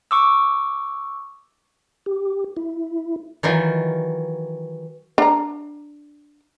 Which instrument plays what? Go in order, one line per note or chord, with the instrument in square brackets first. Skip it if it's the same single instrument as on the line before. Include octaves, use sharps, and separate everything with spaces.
[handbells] C#6 D6 E6
[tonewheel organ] G4
E4
[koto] D#3 E3 F#3 F4
[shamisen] D4 A#5